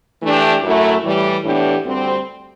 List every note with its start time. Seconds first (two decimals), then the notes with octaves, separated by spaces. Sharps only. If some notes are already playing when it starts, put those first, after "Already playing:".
0.22 E3 A3 D4 G4
0.63 F#2 F#3 A3 E4
1.04 A2 E3 G3
1.44 A2 E3 B3 D4 G4
1.85 D2 D3 G3 C4